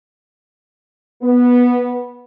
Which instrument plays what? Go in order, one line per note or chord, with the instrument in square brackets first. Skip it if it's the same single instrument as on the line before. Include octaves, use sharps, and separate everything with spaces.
[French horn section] B3